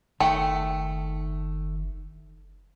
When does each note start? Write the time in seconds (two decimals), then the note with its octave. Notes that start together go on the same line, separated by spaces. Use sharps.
0.20 F#1 D#3 A3 G5